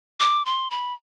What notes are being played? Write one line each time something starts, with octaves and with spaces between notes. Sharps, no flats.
D6
C6
B5